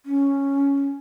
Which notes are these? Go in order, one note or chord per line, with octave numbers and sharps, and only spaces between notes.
C#4